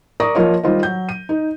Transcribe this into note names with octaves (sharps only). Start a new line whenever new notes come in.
A#4 D5 A#5 C#6 D#6 A#6
F3 A#3 F4 C#5 D#5
D#3 G3 F4 C5 D#5
F#3 G6
D#7
D#4